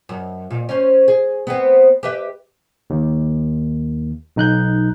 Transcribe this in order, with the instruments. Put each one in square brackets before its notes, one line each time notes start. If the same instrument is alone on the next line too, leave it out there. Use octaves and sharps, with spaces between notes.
[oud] F#2
A#2
C#4 C5
G#4
B3 C4
G4 B4 E5
[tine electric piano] D#2
B1 D#4 F#6 G6